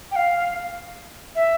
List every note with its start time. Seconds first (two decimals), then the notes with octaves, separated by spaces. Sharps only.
0.11 G5
0.16 F5
1.36 E5